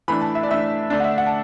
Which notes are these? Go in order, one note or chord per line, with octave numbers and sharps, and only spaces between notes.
E3 A3 D4 B5
A5
E5
D5
E3 A3 D4 E5
D3 A3 D4 D5
F#5
E5
F#5
A5